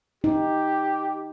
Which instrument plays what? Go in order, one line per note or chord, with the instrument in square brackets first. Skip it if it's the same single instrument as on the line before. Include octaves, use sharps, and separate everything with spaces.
[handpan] D#4 [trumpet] G4